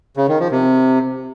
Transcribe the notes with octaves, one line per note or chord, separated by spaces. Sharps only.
C#3
D#3
F3
C3